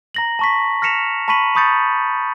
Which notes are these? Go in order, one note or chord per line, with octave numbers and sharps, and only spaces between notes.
A#5 A#6 F#7
A5 C#6 B6
F6 A#6 B6 C#7 E7 F7
A5 B5 C#6 B6 D#7 F#7
B5 C#6 D#6 G6 A6 C#7